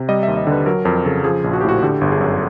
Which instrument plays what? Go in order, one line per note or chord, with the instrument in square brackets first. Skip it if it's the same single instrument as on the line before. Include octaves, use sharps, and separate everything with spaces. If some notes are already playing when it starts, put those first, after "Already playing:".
Already playing: [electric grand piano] C3
G3 D#5
D#2 E5
D#5
D3
B4
F#3 A#4
F2 A#4
C#3 A4
F3 G#4
A#1
F#4
G4
A2 F#4
D3 G4
G1
G#4
F#2